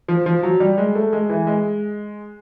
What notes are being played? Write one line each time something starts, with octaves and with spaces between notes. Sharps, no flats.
F3
F3
F#3
G3
G#3
A3
G#3
E3
G#3